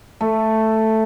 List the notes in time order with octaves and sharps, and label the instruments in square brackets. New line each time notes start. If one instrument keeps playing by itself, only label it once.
[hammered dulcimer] A3